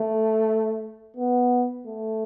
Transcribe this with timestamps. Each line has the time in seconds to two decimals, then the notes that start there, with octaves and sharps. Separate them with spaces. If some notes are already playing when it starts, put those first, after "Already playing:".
Already playing: A3
1.16 B3
1.87 A3